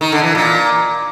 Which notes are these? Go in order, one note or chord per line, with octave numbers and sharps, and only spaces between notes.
D#3
D3
E3
A#2